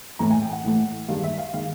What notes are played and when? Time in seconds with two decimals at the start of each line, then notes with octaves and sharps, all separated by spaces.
0.19 A2 E3 A3 A#5
0.30 G#5
0.42 G5
0.53 F#5
0.64 A2 E3 A3
1.08 G2 D#3 G#3 F5
1.24 E5
1.38 F5
1.54 D#3 G#3 F5